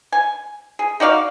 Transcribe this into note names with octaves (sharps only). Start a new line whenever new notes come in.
G#5
G#4
D#4 F#4 D5 F5